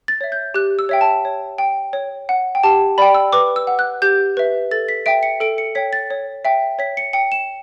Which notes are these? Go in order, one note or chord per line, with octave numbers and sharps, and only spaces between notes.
A6
C#5 E5
G6
G4 F#6
E6
C#5 E5 G5
A5
C#5
G5
C#5
F#5
G5
G4 A5
D5 G5 B5
E6
B4 D6
E6
F#5
F#6
G4 G6
B4 E5
A4 A6
B6
E5 G5 D7
C#7
A4 D7
C#7
C#5 G5 B6
A6
C#5
E5 G5
C#5 B6
C#7
G5 C#7
E7